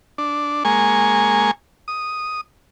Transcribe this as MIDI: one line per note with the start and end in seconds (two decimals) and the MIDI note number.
0.18 0.64 62
0.65 1.51 56
0.65 1.51 58
0.65 1.51 80
0.65 1.51 85
1.88 2.41 87